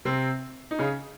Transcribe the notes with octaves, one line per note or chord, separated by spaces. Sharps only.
C3 C4
D#4
C#3 C#4